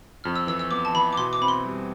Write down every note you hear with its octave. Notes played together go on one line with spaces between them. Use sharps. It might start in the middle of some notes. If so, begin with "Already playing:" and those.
F2 F6
E6
E3 E6
E6
B3 D6
A5
E3 B5
D6
B2 C6
D6
C4 B5
C6
G3